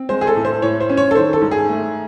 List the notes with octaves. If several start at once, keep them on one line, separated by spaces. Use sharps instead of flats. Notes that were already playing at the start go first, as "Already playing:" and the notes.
Already playing: C4
G#3 C5
G#4
A4
A2
C5
A2 C#5
C5
C#4
C#5
A4
D#3 C5
A4
G#2
G#4
A3